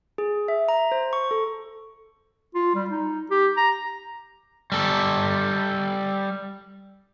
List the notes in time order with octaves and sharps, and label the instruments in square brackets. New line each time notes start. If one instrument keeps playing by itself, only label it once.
[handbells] G#4
E5
A#5
C5
C#6
A4
[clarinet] F4
G3
D#4
G4
A#5
[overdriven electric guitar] G3 A4